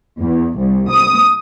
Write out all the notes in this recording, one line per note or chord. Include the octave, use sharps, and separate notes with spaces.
E2
C2
D#6